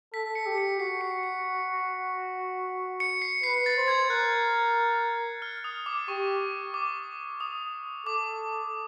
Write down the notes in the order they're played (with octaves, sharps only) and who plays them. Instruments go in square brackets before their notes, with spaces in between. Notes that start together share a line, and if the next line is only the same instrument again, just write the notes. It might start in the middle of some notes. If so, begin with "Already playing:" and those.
[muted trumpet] A4 [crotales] B6
[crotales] C#7
[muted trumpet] G4
[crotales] C#7
[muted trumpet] F#4 [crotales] C7
[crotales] C#7
C#7
C#7
C7
[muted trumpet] B4 [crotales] C7
[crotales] A6
[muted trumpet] C5
[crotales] G#6
[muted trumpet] A#4 [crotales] F#6
[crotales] F6
D#6
D6
[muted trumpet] G4 [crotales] C#6
[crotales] D6
D#6
[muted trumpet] A4 [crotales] D6